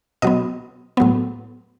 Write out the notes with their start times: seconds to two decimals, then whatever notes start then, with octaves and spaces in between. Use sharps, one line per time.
0.22 B2 F#3 B3 D#5
0.97 A2 F#3 B3